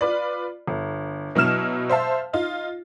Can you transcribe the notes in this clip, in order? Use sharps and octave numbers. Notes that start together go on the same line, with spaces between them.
F4 B4 D5
G1
B2 F#3 E4 F6 E7
C5 E5 F5 A5
D#4 F4